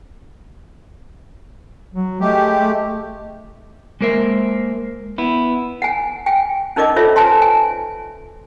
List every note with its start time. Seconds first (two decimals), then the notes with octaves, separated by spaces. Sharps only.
1.94 F#3
2.21 G#3 A3 G4
2.60 A3
4.01 G#3 A#3 A#4 C5 E5
5.18 B3 E4
5.82 F#5 G#5
6.26 G5 G#5
6.76 C#4 D#4 A#4 D5 D#5 D6
6.96 D#4 F4 A4 C5 C#5 E5
7.16 B4 C5 G#5 A5 C6
7.42 G#5